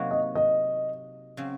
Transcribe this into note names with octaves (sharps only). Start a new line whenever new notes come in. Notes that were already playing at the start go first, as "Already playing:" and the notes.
Already playing: C3 F#3 A#3 D#4 F#4
D#5
D#5
C#3 F#3 C4